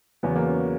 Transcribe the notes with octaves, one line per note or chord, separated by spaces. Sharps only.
E2 C#3 F#3 B3
A#3
C#4